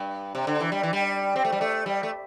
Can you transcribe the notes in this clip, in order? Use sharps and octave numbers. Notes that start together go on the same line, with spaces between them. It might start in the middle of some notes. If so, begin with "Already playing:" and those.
Already playing: G2
C3
D3
E3
G3
E3
G3
C4
A3
G3
A3
G3
A3